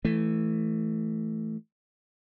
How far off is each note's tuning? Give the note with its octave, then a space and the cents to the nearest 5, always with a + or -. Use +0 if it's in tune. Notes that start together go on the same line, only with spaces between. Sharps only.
E3 +0 A3 +0